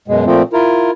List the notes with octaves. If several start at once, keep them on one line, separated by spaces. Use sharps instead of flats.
F#2 B2 G#3
A#2 F3 A3 C4
E4 F4 A#4